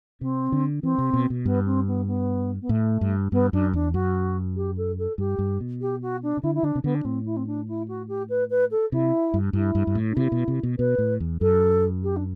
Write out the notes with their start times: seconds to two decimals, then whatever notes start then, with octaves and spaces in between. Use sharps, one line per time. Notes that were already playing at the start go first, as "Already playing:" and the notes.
0.21 C3 C4
0.52 D3
0.82 E3 C4
0.98 C3
1.13 B2
1.30 B2
1.45 G2 B3
1.65 C4
1.87 B3
2.07 B3
2.61 B3
2.69 A2 A3
3.01 G2
3.32 G2 B3
3.53 F#2 D4
3.73 E2 D4
3.93 F#2 F#4
4.56 G4
4.77 A4
4.98 A4
5.18 G2 G4
5.39 G2
5.60 B2
5.81 G4
6.02 F#4
6.23 D4
6.37 C3
6.43 D3 E4
6.54 E4
6.63 D3 D4
6.75 C3
6.84 D3 B3
6.95 D4
7.04 A2 C4
7.25 E4
7.36 C4
7.46 D4
7.68 E4
7.88 F#4
8.08 G4
8.29 B4
8.50 B4
8.71 A4
8.92 C3 E4
9.34 G2
9.53 G2 E4
9.75 G2
9.87 G2
9.95 A2
10.10 D4
10.16 C3 E4
10.32 B2
10.48 C3
10.63 B2
10.78 B2 B4
10.98 A2
11.20 E2
11.41 F#2 A4
12.03 G4
12.16 D4